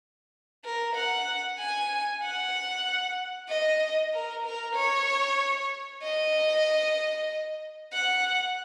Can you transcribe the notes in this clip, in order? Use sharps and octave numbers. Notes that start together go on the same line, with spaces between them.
A#4
F#5
G#5
F#5
D#5
A#4
A#4
C#5
D#5
F#5